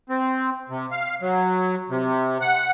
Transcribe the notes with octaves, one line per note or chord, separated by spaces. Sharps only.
C4
C3
F5
F#3
C3
F#5